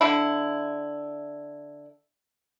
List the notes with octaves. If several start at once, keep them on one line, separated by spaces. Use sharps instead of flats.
D3 E4